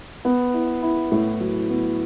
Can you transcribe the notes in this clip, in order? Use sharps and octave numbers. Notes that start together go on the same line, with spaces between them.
B3
E4
E4
A2
F#3
B3